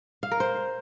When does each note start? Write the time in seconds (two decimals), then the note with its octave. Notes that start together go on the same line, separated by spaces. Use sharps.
0.23 F5
0.32 A#4
0.40 C5